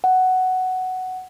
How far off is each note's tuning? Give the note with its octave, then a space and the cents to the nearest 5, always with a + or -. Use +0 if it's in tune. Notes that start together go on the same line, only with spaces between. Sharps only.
F#5 +5